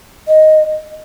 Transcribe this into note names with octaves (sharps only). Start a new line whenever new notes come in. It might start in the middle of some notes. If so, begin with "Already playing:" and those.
D#5